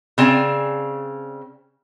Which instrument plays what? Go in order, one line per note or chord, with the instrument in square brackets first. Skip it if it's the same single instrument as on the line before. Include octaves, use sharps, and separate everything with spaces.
[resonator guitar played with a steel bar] C#3 C4 D5 G#5